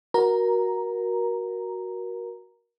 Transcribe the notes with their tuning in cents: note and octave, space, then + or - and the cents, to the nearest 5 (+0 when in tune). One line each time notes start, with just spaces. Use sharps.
F#4 +0 A#4 +20 A#5 +0